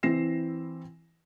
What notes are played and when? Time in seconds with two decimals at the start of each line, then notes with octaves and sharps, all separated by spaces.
0.03 E3 C4 E4 A#6 C7 E7